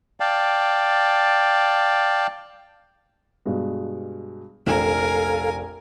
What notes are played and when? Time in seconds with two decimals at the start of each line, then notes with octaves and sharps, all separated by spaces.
0.20 D5 F5 G5 A5
3.45 G2 B2 G#3
4.67 F1 A#1 A4 A#4 F5 G#5 E7